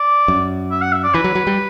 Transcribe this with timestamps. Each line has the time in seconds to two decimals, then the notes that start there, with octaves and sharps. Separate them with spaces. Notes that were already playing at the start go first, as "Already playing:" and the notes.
Already playing: D5
0.28 F#2
0.71 E5
0.82 F#5
0.92 E5
1.04 D5
1.14 E3 B4
1.24 F#3
1.35 F#3
1.47 G3